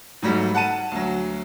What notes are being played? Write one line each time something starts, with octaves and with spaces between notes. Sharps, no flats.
G#2 F#3 G3 A3
F#5 A5 D#7
D2 F#3